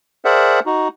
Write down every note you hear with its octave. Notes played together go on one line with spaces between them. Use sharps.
G#4 A#4 C5 D5 E5 F#5
D#4 F#4